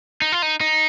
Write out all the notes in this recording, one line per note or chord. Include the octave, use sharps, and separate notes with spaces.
D#4
F4
D#4
D#4